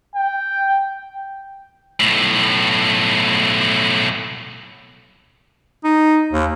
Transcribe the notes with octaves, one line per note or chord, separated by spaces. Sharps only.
G5
B1 A2
D#4
D#2